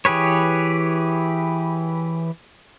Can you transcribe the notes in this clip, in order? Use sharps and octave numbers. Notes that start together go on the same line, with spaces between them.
E3 G4 G#4 B4 C#5